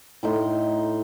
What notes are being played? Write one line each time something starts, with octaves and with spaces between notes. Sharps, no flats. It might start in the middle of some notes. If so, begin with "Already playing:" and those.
A2 D#4 C6